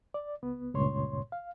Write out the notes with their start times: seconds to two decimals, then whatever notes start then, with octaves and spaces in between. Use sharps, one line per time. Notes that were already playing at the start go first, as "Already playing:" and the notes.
0.14 D5
0.42 C#2 B3
0.74 C#2 G2 A#2 C#5 C6
1.32 F5